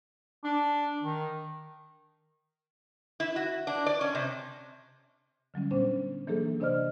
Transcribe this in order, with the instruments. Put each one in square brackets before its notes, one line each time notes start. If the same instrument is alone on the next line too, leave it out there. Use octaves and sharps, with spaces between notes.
[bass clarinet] D4
D#3
[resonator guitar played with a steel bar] E4
F#4
D4
D5
C#4
C3
[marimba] D3 F#3 G3 C#4
A#2 G3 B3 C#4 D4 C5
E3 F#3 A#3 D4 G#4 A4
C3 D4 C5 D5 D#5 F6